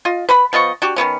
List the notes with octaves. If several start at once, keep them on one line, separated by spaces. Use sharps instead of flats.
F4 D#5
B4 F#5 B5
F3 B3 D#5 C#6
D4 F#4 G4
D#3 G#3 B3 C#4